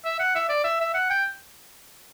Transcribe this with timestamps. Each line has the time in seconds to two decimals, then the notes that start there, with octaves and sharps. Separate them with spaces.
0.05 E5
0.20 F#5
0.35 E5
0.49 D5
0.64 E5
0.80 E5
0.94 F#5
1.10 G5